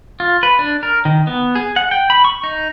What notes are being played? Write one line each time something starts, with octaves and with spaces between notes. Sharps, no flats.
F4
B4
D4
A#4
D#3
B3
G#4
F#5
G5
B5
C#6
D#4